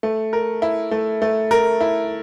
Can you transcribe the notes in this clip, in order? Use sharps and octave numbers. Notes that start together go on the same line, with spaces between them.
A3
A#4
E4
A3
A3
A#4
E4